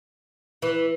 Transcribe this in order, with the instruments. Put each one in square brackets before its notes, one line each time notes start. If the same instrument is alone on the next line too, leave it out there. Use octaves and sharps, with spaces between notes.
[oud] E3